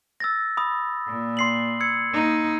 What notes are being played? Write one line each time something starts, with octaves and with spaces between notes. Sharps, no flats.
E6 A6 A#6
B5 D#6
A#2
C6 C7 F#7
E6 G#6 C#7
A#3 D#4